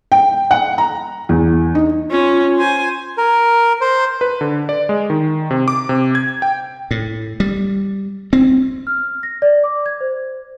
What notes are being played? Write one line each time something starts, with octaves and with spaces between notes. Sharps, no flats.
G5
F#5
A#5
E2
D#4
C#4 F4
C5 G#5
A#4
C5
B4
D3
D5
G#3
D#3
C3
D6
C3
G#6
G5
A2
G3
C4
F6
A#6
D5
D6
G#6
C5